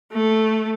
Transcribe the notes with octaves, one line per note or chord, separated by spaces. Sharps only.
A3